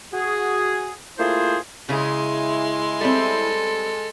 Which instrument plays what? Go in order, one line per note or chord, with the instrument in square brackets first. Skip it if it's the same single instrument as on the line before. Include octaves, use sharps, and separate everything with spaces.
[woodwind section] F#4 G#4
A3 A#3 E4 F4 G#4 C5
[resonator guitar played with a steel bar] C#3 G#4 [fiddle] G#3 C6 [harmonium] E4
[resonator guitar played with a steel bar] G3 C4 [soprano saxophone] A4